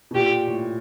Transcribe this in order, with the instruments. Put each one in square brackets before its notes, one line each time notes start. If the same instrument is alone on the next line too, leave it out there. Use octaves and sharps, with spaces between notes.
[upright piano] B2
[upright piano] A#2 [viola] G4
[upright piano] A2